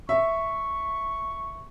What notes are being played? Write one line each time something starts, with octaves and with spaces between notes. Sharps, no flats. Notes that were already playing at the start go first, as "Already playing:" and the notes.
E5 C#6